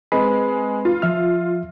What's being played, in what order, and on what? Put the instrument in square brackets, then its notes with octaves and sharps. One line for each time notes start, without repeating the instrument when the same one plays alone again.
[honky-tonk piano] G#3 [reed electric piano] C4 B4 B5
[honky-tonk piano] F4
[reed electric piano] F3 E5 F6